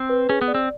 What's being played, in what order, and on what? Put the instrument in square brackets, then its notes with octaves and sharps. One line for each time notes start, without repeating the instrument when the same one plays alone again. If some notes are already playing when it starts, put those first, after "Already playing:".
Already playing: [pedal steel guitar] C4
[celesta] B4
[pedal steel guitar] C#4 [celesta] G#4
[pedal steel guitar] B3
[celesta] D5
[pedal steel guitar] C4